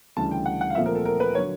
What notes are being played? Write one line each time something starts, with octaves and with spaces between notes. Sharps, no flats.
D2 C#3 E3 G3 A5
G5
F#5
F#5
F5
A#2 F3 A3 C4 E5
A#4
A4
A#4
B4
D3 F#3 C#5